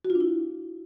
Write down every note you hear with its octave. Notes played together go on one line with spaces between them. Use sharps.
F#4
F4
D4
E4